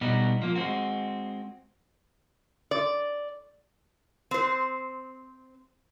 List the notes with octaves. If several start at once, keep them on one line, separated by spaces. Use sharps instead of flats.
B2 G3 B3 D#4
F3 A#3
G#3 C4 F#4
D5
C4 C5